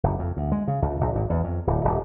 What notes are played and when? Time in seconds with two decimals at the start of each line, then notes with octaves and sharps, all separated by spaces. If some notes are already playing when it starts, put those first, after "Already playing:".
0.03 F#1
0.19 F2
0.37 D2
0.52 G#3
0.68 C#3
0.82 C#2
1.01 A#1
1.15 G#1
1.30 E2
1.44 F2
1.67 D1
1.85 D#1